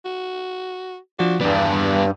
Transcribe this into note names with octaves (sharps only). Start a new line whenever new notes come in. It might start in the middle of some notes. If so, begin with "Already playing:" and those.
F#4
F3 D4 F#4
E2 G2 B3 D4 B4 D5